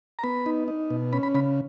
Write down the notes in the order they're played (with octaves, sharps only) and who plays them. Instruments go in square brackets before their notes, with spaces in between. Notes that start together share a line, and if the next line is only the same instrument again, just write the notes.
[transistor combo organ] A#5
B3 B5
D#4
D#4
B2
C#4 B5
B5
C#3 B5